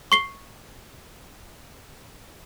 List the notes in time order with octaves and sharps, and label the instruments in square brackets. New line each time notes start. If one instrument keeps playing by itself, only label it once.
[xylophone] C#6 C7 G7